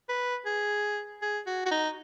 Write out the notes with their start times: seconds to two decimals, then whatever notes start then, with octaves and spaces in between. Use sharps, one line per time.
0.09 B4
0.46 G#4
1.22 G#4
1.46 F#4
1.66 F#4
1.71 D#4